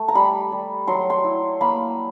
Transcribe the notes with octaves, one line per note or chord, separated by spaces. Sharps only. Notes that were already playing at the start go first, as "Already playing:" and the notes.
Already playing: A3
A#5
G3 B5
G3
F#3 C6
C6
E4
A#3 B5